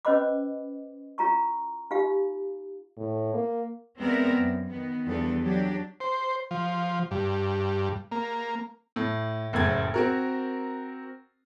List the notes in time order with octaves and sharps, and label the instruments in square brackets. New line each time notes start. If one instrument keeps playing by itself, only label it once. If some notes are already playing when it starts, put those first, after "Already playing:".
[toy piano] C#4 B4 C5 D#5 B5 D6
E4 F4 A#5 C#6
D#4 F4 G4 F5
[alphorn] A2
A#3
[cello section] G#3 B3 C4 A#4 D5 E5
F#2
D#3 B3
E2 F3 G3 B3 D4 A4
F#3 D4 G4
[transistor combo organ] C5
F3
G2
A#3
[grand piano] A2
F#1 F#2 A2 E4 G#6 A6
C4 F#4 A#4